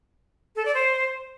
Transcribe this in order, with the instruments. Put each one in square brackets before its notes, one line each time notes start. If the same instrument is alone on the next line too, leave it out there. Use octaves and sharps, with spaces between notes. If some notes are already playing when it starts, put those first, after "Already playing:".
[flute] A4
D5
C5